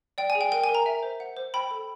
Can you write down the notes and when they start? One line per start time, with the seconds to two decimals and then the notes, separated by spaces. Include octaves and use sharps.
0.18 D5 G5
0.30 G#5
0.35 G#4
0.41 G5
0.52 A#4 G5
0.64 G#5
0.69 A#4
0.75 A#5
0.86 E5
1.03 C5
1.20 F#5
1.37 C5
1.54 G5 B5
1.71 A4